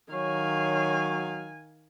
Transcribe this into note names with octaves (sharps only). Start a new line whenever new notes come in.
D#3 F#3 C#5 F5 G#5